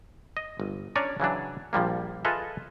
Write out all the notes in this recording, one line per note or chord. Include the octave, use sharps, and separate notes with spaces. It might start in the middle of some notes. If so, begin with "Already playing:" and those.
D#5
G1
C#4 D4 C#5 D5 G#5 A#5
C#3 E3 F#3 D4
A#1 F3 G3 A#3
F4 G#4 A4 B4 D#5 E5